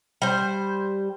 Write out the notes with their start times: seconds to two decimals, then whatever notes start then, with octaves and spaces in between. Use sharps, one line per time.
0.22 G3 C5